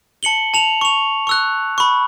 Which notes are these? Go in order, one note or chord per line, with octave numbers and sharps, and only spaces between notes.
A5 C#7 F#7 G7
A5 F7 F#7
C#6 F7
C#6 E6 F#6
B5 C#6